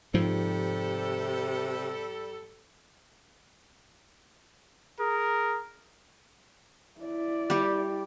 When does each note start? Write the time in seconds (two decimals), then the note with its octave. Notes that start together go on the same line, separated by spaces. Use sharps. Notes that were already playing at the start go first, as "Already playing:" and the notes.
0.14 G#2 C3 F3 G3 A4
5.00 G#4 A#4
7.01 E4 D5
7.50 G3 G4